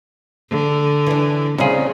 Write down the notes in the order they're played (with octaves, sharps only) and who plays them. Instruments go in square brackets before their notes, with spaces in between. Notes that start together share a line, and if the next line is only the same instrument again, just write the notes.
[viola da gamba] D3
[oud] E3 D4
[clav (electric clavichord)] C2 G#4 [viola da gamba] C#3 [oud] C#4 F4